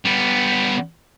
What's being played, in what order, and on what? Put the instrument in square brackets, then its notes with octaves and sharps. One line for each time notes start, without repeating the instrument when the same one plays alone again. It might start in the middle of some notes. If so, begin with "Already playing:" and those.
[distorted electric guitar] G3 B3